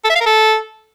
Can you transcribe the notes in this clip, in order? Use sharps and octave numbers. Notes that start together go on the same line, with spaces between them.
A4
E5
F5
A#4
A4